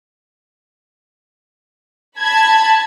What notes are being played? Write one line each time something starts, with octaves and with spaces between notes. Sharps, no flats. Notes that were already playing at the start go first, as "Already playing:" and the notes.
A5 B5 G#6